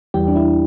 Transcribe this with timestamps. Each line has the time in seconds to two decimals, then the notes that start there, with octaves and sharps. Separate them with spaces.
0.14 E2 E3 G3 G4
0.28 D4
0.36 E4